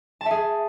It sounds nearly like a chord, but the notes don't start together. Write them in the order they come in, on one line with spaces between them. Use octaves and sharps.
A5 E5 G#4